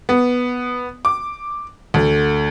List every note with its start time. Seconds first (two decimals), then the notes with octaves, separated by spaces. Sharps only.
0.09 B3
1.05 D6
1.94 D2